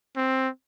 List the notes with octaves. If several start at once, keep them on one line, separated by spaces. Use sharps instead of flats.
C4